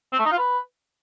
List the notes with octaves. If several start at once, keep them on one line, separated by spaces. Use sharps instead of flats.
C4
A3
D#4
F4
B4